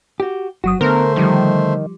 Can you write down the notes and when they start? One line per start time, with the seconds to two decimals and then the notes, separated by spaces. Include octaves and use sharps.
0.20 F#4 G4
0.64 G1 F#3 F#4 D#6
0.81 D3 A3 B3 A#4 C5
1.16 D#3 F3 G3